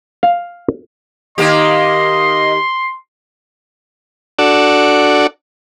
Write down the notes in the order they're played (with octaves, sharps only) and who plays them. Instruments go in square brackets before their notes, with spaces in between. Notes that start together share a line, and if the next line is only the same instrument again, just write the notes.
[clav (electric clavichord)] F5
[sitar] D#3 A#3 G4 [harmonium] D#5 [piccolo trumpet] C6
[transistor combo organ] D4 F#4 A4 D5